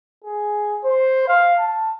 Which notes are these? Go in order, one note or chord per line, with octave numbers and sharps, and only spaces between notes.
G#4
C5
F5
A5